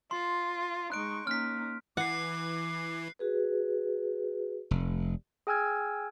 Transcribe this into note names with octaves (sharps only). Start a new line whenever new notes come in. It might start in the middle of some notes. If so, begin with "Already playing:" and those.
F4 C6
G#3 D#4 C#6 F#6 D7
A#3 C#4 D#4 F6 B6
E3 F#5 D6 F#6 C7
F#4 G#4 B4
F1
G#4 G5 G#5 E6 F6 G#6